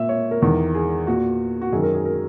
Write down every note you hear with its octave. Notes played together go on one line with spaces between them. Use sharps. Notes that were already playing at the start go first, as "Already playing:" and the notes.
Already playing: A#2 E5
C#5
A#4
E2 D#3
G#4
A#2 F#4
F#4
F#2 D#3 G#4
A#4
G#4
A#4